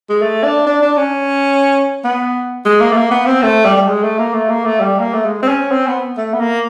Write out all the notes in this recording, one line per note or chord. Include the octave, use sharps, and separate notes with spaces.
G#3
A3
D4
D4
D4
C#4
B3
G#3
A#3
A3
A#3
B3
C4
A3
G3
G3
G#3
A3
A#3
A3
A#3
A3
G3
A#3
A3
G#3
C4
C#4
C4
B3
A3
B3
A#3